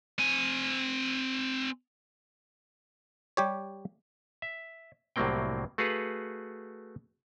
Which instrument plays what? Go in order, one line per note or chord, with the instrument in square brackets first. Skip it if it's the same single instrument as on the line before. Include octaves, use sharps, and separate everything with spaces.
[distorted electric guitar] C4 G#5
[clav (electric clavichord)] G3 G4 C#5
E5
C2 A2 F#3 A#3 C4 G5
A3 F#4 G#4 B4 F5 F#5